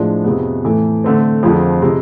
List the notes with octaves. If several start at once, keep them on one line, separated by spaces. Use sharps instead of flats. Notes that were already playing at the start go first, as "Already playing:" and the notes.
Already playing: A2 F3 G#3 D4
F2 C3 G#3 B3
A2 E3 A3
D3 A3 C4
F2 D3 F3 G#3
C3 G#3